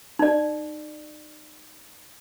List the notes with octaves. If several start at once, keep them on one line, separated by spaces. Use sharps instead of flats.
D#4 D5